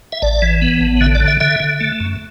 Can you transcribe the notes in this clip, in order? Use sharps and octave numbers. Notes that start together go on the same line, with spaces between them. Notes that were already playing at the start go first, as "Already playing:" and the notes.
E5
A1 D5
E3
B3
A1
D3 E5
D5
D3
E5
D3 E5
D3
A3
F#2